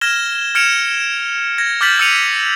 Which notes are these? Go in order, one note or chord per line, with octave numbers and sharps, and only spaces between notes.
F6 G#6 A#6 E7 G7
F6 G#6 C#7 D7 E7 F7
G#6 A#6
D6 F6 G6 A6 B6 F#7
E6 G#6 C#7 D#7 F7